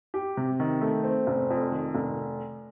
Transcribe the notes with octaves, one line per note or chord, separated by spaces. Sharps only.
G4
C3
D#3
A3
C4
F1
F2
D#3
F1